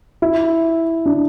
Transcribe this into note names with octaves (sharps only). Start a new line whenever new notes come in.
E4
D4